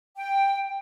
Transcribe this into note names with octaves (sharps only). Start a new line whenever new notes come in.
G5